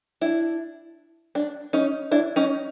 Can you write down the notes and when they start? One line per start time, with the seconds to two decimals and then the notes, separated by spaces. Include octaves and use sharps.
0.21 D4 E4
1.35 D4
1.73 C#4 D#4
2.11 D4 E4
2.36 C#4 D#4